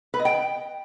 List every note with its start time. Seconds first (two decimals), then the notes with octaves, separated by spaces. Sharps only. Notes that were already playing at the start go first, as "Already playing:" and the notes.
0.14 B4
0.19 D#5
0.25 G5